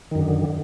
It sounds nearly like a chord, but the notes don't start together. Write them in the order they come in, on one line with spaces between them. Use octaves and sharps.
D#3 F#2 D3